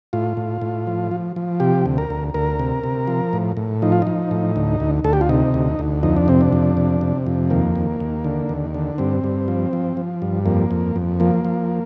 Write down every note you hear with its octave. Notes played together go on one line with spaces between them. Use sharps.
A2 F4
A2
A2
F3
F3
F3
C3 G4
D2
A#4
D2
D2 A#4
C3
C3
F3
A2
A2
F3 D#4
F4
F3 D#4
A2
D2
D2
D2 A4
G4
F4
C3 D#4
D2
D2
F2 D#4
D4
C3 C4
D4
F2
C3
C3
F2
D#2 A#3
D#2
D#2
D3
D#2
D3
G2 C4
G2
F3
F3
F3
G2
F2 A#3
F2
F2
F3 A#3
F3